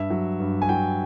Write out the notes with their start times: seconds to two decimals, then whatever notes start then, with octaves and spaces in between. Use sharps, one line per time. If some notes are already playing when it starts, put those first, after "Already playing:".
Already playing: G2 E5
0.10 F#3
0.40 G2
0.62 G#5
0.69 F#3 G5